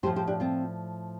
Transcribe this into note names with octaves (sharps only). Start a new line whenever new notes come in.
A2 F3 G4 C5
G4 C5
D4 G4
C4 F4